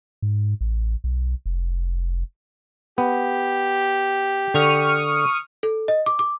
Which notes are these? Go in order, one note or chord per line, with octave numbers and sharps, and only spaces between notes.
G#2
A1
B1
F1
B3 G4
D3 C#6 D#6 F6
A4
D#5
D6
D6